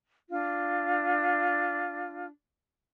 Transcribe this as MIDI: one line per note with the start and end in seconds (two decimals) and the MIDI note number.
0.29 2.27 62
0.29 2.27 65